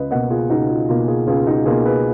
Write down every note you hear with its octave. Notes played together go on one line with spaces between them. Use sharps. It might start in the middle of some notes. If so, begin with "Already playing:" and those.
Already playing: C#2 B4 D#5
B2 A#3 D#5 F#5
F4 G#4
C#2 D#4 F#4
F4
B2 A#3 F4
F4 G#4
C#2 F4 G#4
D#4 F#4
B2 A#3 F4 G#4
G#4 B4